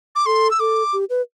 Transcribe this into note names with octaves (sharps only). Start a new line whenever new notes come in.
D6
A4 C6
E6
A4 D6
G4
B4